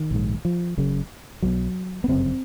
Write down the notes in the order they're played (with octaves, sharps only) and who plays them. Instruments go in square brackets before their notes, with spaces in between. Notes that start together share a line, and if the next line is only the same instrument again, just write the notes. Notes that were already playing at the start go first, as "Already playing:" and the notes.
Already playing: [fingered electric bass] D#3
A#1 G#2
F3
F#1 F#2 C#3
B1 B2 F#3
B3
G1 F#2 C#3 C4